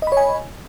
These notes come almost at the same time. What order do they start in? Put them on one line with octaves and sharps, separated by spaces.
D#5 B5 C#5 G#5